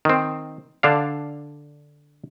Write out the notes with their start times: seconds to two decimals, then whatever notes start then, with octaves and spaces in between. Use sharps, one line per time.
0.05 D#3 C4
0.83 D3 D4 F5